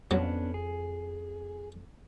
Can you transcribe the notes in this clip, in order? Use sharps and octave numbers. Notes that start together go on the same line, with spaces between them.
F2 F#3 B3 C#4 D4
G#4